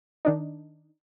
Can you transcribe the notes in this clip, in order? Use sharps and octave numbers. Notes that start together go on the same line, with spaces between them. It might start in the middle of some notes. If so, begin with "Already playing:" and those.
D#3 D4 D#4